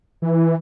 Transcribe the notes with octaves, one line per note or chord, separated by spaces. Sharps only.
E3